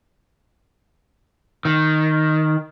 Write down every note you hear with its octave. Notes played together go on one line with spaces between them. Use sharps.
D#3